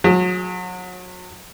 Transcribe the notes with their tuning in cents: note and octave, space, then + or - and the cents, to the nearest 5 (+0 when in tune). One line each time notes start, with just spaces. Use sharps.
F#3 -30 G#4 +0